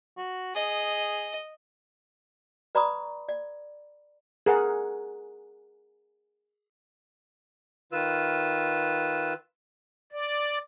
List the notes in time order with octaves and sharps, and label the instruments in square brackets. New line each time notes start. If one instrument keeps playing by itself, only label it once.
[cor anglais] F#4
[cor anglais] G#4 [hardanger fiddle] D#5
[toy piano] B4 D5 A#5 B5 C#6 D#6
D5
[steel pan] G#4 A#4 F#5
[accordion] D#3 F4 B4 E6
[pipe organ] D5